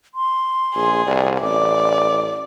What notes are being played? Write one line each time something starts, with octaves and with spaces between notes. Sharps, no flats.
C6
A#1 G#4
C2 D5
A1 D5 D6